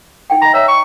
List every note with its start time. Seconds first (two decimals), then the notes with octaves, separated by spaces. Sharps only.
0.30 D#4 F#5 G5
0.42 D#5 A#5 B5
0.54 C#5 E5 A#5
0.68 C#6